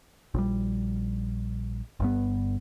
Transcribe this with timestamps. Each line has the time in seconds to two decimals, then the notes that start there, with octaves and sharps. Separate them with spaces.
0.34 A#1 G3
2.00 G1 G2 B3